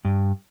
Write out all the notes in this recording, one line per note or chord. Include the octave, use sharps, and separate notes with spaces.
G2